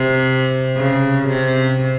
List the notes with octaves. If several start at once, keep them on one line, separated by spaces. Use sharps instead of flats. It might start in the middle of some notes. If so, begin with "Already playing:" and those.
Already playing: C3
C#3
C3